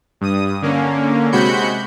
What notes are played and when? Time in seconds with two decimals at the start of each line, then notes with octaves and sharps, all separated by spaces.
0.21 G2 D#6
0.62 D3 A#3 C#4
1.32 C3 G#3 F#4 B5 G6 C#7